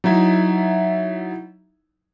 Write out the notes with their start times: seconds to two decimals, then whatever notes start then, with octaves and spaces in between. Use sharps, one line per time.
0.04 F#3 D#4 E4 E5